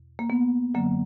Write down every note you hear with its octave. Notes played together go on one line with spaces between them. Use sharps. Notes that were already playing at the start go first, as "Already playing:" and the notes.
Already playing: E2 B2
A#3
B3
F#2 D3 F#3 A#3